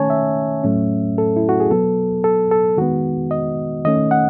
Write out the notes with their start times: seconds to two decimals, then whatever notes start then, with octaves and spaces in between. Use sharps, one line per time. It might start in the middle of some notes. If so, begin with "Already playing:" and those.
Already playing: D#3 A3 C#4 C#5 G#5 A5
0.10 E5
0.64 A2 F#3 A3 C#4
1.18 A4
1.36 E4
1.49 F#4
1.60 G#4
1.71 B2 F#3 B3 A4
2.24 A4
2.51 A4
2.77 D#3 G#3 B3 F#4
3.31 D#5
3.85 D#3 A3 C#4 D#5
4.11 F#5